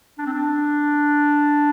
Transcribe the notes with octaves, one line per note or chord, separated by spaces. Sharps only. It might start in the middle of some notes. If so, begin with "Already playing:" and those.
D4
C4
D4